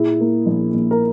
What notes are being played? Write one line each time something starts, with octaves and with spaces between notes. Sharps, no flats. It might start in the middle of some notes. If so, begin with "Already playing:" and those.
Already playing: A#2 E4 G#4
A#3
A#1
A#1
A#4